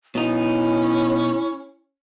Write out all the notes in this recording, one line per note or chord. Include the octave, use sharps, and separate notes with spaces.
B2 C#4 D#4 E4